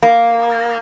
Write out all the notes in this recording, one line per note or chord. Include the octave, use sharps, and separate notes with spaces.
A#3